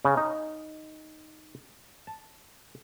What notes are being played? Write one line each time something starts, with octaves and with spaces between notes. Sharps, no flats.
C#3
D#4
A5